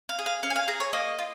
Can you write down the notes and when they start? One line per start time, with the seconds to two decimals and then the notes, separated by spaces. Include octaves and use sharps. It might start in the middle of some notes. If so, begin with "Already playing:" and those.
0.09 F5
0.19 G#4
0.26 F5
0.43 C#4 F5
0.50 G#5
0.56 F5
0.68 G#4 A#5
0.80 C#5
0.93 A#3 D#5
1.19 F4